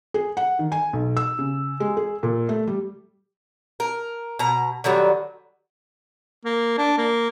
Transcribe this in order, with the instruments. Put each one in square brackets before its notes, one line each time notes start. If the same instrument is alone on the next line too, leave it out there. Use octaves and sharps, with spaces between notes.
[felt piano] G#4
F#5
D#3
G#5
B1
E6
C#3
G#3
G#4
A#2
A3
G3
[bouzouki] A#4
B2 A#5
D3 D#3 F#3 G3
[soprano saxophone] A#3
D4
A#3